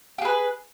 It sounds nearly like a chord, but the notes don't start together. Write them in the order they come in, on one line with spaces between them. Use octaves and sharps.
G4 G#4 B4